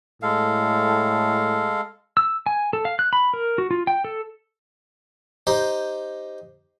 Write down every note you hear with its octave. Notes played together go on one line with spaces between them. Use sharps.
A2 G#3 A4 F5
E6
G#5
A4
F5
F#6
B5
A#4
F#4
F4
G5
A4
D#4 G4 C5